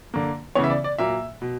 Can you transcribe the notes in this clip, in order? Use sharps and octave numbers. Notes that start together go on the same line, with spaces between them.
D3 A#3
C#3 E3 B3 C#5
E5
D5
D5
A#2 F#3 A#3 E5
B2